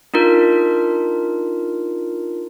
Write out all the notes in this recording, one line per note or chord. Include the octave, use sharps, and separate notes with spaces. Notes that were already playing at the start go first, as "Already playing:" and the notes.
D4 D#4 F4 A#4